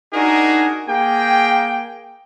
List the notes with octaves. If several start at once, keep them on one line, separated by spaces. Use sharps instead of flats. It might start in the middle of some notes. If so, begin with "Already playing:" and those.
D4 D#4 F#4 G#4 A#4
A#3 G#4 G5